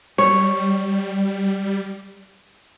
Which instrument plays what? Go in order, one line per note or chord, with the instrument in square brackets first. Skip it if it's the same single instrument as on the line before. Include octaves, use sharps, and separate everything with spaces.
[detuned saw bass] G3 [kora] C#5